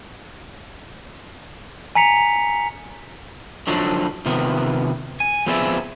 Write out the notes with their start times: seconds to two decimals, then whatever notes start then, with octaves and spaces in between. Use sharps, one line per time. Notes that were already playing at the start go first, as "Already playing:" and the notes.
1.95 G#5 A#5 B6 C#7 F7
3.67 D3 F3 F#3 D4 D#4
4.26 C3 D#3 F3 B3
5.20 G#5
5.47 F3 B3 C4 G#4 D5 E5